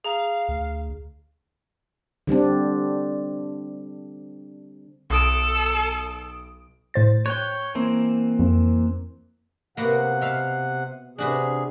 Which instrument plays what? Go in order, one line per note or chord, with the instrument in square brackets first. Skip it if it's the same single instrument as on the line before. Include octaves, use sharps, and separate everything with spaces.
[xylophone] G#4 A#5 [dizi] F5
[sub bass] D2
[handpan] D3 G3 C4 D4
[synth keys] B1 D#6 D7 [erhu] A4
[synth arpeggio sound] A2 C5 A6
[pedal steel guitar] C#5 G5 [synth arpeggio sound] F#6
[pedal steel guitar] E3 A#3 C4
[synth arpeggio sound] F2
[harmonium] C3 F#5 [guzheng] A#3 B3 F#4
[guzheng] B2 E5 F5
[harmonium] C3 G#4 [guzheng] D4 F#4 B4